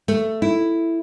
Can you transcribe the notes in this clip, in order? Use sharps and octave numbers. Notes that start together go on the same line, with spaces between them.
A3
E4